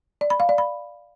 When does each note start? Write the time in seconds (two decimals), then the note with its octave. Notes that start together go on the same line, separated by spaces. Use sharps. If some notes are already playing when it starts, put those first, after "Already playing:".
0.21 D5
0.30 B5
0.40 F5
0.49 D5
0.58 B5